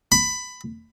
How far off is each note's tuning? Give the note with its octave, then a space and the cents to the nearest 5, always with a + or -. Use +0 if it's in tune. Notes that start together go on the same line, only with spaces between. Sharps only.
B5 +15